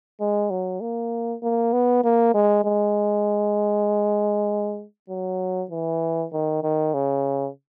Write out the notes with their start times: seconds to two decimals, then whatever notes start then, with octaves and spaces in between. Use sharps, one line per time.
0.21 G#3
0.50 F#3
0.81 A#3
1.42 A#3
1.73 B3
2.04 A#3
2.34 G#3
2.65 G#3
5.09 F#3
5.71 E3
6.32 D#3
6.63 D#3
6.94 C#3